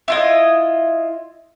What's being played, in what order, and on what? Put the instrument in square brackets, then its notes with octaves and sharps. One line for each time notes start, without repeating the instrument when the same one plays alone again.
[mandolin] E4 F4 D#5